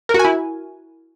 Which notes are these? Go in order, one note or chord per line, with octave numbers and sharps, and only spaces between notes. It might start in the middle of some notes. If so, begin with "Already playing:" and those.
A#4
F#4
G#5
E4